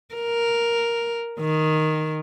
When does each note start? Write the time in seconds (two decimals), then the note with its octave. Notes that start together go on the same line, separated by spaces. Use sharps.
0.15 A#4
1.40 D#3